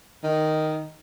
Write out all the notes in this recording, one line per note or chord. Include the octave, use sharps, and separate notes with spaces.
D#3